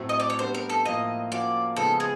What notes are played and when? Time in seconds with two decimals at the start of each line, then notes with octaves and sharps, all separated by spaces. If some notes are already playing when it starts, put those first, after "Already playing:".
Already playing: A2 F#3 A3 C4
0.09 D#5
0.20 D5
0.30 C#5
0.39 G3 B3 D4 G4 C5
0.54 A#4
0.69 A4
0.85 A2 F3 A#3 D#5
1.32 F3 A#3 C#4 F#4 D5
1.76 C#3 F3 G#3 B3 D#4 A4
2.00 G#4